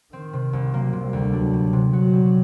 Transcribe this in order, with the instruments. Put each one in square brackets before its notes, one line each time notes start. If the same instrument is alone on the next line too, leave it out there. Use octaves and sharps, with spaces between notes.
[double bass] D#3 [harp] C4
[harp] C3
C2
[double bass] F#3 [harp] A#3
[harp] C3
[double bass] G3
[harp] D2
[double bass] F#3 [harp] D4
[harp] G3
C3
[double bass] F#3 [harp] F#4
[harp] G3